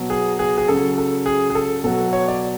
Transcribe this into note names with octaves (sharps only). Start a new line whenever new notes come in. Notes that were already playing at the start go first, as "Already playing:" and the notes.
Already playing: B2 F#3
G#4
G#4
G#4
C#3 F#3 A4
A4
G#4
G#4
A4
B2 F#3 A4
C#5
D5